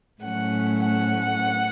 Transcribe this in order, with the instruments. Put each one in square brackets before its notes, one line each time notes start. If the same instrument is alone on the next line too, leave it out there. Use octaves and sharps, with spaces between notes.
[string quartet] A2 F#3 A3 C#4 F#5
F#5